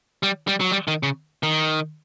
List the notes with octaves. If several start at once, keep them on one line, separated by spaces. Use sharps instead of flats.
G3
G3
F#3
G3
D#3
C#3
D#3